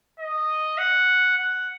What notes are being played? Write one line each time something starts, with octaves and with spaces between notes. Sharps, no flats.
D#5
F#5
F#5